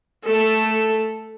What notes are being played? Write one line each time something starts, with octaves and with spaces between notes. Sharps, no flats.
A3 A4